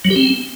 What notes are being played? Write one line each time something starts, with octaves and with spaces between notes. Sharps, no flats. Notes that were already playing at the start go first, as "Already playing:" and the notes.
F#3
G4
C4